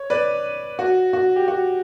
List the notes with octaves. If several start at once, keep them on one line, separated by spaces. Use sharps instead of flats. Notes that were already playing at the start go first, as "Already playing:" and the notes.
Already playing: C#5
B4 D5
F#4
F#4
G4
F#4